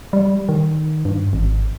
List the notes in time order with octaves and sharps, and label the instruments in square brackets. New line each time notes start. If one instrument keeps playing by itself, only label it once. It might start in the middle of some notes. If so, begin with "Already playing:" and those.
[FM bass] G3
D#3
G2
G#1